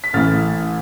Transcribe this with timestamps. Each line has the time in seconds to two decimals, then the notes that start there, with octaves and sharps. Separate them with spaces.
0.04 B6
0.13 A1 A2 E3 F6 A6